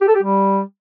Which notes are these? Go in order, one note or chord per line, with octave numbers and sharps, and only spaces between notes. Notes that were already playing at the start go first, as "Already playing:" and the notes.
G4
A4
G4
G3